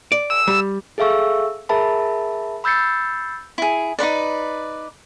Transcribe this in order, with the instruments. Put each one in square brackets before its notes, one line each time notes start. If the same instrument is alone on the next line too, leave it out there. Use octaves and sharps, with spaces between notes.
[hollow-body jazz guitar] D5
[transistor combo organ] E6
[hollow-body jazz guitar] G3
[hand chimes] G#4 A4 E5 F5 C#6 E6
G#4 A#4 E5 A5 B5
B5 E6 G6 A6 C7 C#7
[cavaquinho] E4 G#4
D#4 E4 B4 D5